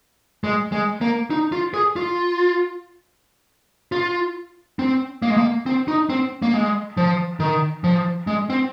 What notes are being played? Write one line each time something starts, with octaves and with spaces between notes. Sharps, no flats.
G#3
G#3
A#3
D#4
F4
G#4
F4
F4
C4
A#3
G#3
A#3
C4
D#4
C4
A#3
G#3
F3
D#3
F3
G#3
C4